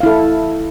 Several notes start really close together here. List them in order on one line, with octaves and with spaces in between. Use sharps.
F5 E4 A4